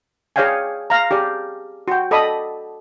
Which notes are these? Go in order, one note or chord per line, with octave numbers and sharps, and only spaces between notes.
G#4 C#5 D5 F5 G5 G#5
F5 A#5
G4 G#4 D5
F#4 G5
A4 D5 D#5 B5 D#6